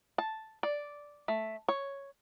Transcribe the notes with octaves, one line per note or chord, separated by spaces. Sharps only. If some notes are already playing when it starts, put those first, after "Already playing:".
A5
D5
A3
C#5